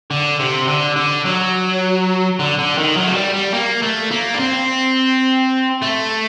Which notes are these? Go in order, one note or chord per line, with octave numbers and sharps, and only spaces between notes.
D3
C3
D3
D3
F#3
D3
D3
D#3
F#3
A3
G3
G3
A#3
A3
A#3
D4
C4
A3